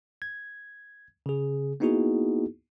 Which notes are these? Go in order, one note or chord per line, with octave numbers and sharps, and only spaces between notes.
G#6
C#3 G#4
A#3 B3 D#4 E4 F#4 G#4